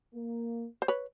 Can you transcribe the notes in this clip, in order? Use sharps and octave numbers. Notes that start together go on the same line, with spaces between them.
A#3
C5
B4 C#5